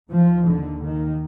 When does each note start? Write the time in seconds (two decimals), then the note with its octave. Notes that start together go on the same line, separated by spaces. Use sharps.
0.10 D#2 F3
0.46 D3
0.83 D#3